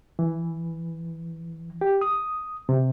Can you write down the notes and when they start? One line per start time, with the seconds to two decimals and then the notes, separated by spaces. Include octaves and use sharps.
0.19 E3
1.81 G4
2.01 D#6
2.69 C3